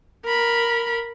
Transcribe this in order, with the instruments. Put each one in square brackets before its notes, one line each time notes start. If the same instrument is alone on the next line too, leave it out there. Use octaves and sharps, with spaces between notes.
[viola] A#4 B5